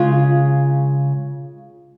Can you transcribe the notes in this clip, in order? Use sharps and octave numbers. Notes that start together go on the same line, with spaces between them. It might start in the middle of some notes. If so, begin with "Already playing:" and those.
Already playing: C#3 G#3 F4